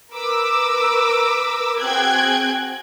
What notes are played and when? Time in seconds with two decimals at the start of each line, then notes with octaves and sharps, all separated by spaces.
0.13 A#4 B4 D6 E6
1.80 C4 F#4 G#4 G5 F#6 G#6